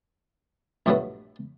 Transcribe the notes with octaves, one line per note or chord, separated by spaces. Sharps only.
A#1 G2 B2 F#3 A3 B3